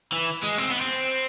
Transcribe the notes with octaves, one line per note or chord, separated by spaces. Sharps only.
E3
G#3
C4
B3
C4